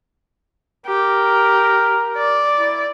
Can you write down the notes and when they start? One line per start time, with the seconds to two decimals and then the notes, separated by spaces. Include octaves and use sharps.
0.86 G4 A#4
2.17 D5
2.59 E4